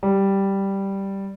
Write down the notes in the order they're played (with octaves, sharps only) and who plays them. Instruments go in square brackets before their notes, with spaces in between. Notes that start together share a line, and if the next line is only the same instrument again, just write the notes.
[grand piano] G3